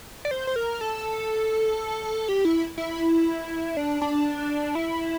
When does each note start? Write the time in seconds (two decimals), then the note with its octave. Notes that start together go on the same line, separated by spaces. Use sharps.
0.25 D5
0.31 C5
0.47 C5
0.56 A#4
0.81 A4
2.29 G4
2.45 E4
2.78 E4
3.77 D4
4.02 D4
4.75 E4